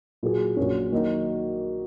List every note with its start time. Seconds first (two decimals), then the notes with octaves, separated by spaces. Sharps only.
0.23 A#2 F#3 A#3 F4 G#4
0.57 A#1 A#2 F#3 C#4
0.92 D#3 F#3 A#3 D#4 F#4